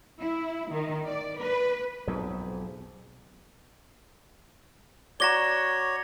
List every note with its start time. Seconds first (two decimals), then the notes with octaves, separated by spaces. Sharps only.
0.21 E4
0.71 D#3
1.07 D5
1.40 B4
2.07 B1 F2 G#2
5.20 F#4 C#5 D5 A#5 A#6 G7